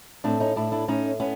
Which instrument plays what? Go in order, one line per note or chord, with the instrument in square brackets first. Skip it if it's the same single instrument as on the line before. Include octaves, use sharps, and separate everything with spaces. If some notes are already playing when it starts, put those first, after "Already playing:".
[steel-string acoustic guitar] A2 C4 D4
C#4 D#4
A2 D4 E4
D4 E4
A2 C#4 D#4
B3 C#4